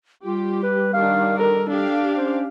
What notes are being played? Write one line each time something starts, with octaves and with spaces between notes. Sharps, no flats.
G3 F4 G4
B4
D#3 D4 F5
A4 A#4
D4 G4 F5
C#4 C5